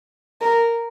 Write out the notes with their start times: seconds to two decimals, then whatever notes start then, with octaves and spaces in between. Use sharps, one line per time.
0.41 A#4